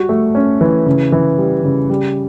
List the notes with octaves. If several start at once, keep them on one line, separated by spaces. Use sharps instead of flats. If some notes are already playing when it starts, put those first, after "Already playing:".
Already playing: G3 F#4
A3
C#4
E3
C#3
E3
G3
C#3
G3